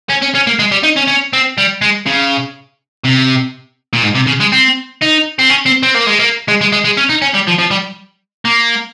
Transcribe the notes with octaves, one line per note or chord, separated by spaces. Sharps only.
C#4
C#4
C#4
A#3
G#3
G3
D#4
C#4
C#4
C4
G3
G#3
C#3
C3
A#2
G#2
C3
C#3
G#3
C4
D#4
C4
C#4
C4
C4
A#3
G#3
A#3
G#3
G#3
G#3
G#3
C#4
D#4
C#4
G3
F3
F3
G3
A#3